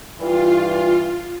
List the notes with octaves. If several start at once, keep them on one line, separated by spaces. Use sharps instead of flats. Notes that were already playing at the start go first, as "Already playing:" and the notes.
G2 E3 F4